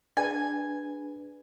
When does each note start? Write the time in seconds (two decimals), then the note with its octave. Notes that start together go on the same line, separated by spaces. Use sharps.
0.17 D4 G#4 B4 G#5